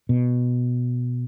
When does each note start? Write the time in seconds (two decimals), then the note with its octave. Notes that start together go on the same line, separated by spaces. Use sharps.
0.09 B2